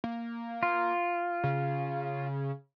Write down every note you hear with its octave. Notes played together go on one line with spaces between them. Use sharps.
A#3
F4
C#3